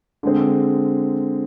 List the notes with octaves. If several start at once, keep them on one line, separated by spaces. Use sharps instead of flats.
D3 G#3 C4